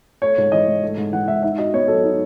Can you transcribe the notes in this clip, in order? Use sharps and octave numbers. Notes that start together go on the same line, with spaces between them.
A3 C#5
G#2
E3 D#5
G#2
A3
G#2
E3 F#5
G#2 E5
D#4 E5
F#4 D#5
B3 C#5
F#3 A4
D#4